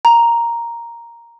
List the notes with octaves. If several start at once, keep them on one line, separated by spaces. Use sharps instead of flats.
A#5